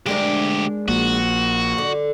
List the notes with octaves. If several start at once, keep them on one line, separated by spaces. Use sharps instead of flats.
D2 G#3 D4 G4 A#4
A#1 A#2 F#4
D3